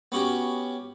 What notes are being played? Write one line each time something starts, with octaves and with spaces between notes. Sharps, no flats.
B3 C#4 F#4 G4